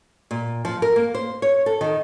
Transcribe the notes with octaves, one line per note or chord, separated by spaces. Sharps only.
A#2
F3
A#4
A#3
C5
C#5
A4
D#3